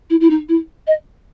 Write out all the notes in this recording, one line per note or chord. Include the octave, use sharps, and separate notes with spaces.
E4
E4
D#4
E4
D#5